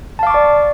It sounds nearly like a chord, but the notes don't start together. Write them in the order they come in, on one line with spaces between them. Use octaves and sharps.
A5 F5 D6 C#6 D5